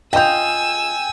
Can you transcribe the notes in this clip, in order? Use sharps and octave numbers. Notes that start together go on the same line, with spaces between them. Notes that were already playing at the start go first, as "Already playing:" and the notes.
F4 D#5 G5 G#5 E6 G6